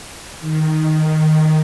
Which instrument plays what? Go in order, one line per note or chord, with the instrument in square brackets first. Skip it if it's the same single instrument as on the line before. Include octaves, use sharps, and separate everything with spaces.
[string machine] D#3